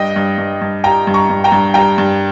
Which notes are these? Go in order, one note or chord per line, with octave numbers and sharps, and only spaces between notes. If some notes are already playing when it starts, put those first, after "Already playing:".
Already playing: G2 D#5 G5
G2
G2
G2
G3 G5 A#5
G2
A#5 C#6
G2
G5 A#5
G2
G3 G5 A#5
G2